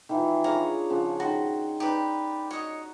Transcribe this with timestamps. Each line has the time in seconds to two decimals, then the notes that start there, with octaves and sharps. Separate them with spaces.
0.09 D#3 E3 F4
0.44 D4 G#4 C#5 F5 A#5
0.90 C#3 F3 F#5
1.20 D#3 F#4 C6
1.80 D#4 G4 B4 D5
2.51 F#4 C#5 D#5